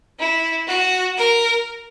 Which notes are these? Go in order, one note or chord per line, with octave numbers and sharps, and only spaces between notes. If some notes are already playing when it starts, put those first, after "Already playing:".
E4
F#4
A#4